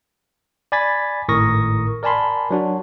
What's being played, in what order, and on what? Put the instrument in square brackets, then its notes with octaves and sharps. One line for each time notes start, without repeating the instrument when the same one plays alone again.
[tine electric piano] D5 G#5 B5 G#6 A6 B6
G#1 A2 A#4 C#6 D#6 A#6
A#4 D5 G#5 A5 B5 C6
F#3 D4 F#4